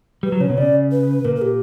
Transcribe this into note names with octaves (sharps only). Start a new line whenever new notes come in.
G3 B4
F#3
C#3 C#5
B2
C#3 D5
B4
A#2 A#4
A#4
G4